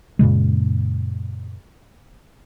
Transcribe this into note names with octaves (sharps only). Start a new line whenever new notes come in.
F#2 A#2 C#3 G#3